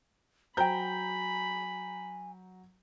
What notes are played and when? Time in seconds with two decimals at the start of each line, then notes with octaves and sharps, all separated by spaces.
0.57 F#3 C5 G5 G#5 A#5 B5 G6